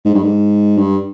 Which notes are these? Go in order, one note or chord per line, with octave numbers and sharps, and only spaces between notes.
G#2
G2
G#2
G2